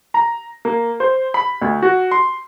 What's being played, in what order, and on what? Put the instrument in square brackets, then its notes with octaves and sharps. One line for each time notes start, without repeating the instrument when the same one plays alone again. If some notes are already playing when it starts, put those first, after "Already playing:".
[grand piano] A#5
A#3
C5
B5
D2
F#4
C6